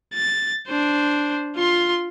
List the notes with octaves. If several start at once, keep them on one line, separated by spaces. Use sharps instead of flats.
A6
D4 C5
F4 C6